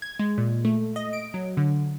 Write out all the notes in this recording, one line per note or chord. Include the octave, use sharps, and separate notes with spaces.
G#6
G#3
A#2
A3
D#5
D7
F#3
D3